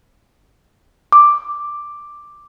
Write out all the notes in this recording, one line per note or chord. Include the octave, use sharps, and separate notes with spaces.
D6